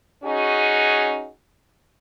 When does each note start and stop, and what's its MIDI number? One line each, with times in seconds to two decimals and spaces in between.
0.24 1.29 61
0.24 1.29 63
0.24 1.29 66
0.24 1.29 68